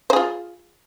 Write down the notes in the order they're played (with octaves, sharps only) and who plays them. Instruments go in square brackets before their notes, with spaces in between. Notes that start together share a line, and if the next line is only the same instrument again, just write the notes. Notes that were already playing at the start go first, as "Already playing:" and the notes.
[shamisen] C5
G#4
F4